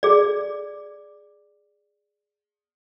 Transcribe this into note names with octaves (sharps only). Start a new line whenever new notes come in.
G#4 D5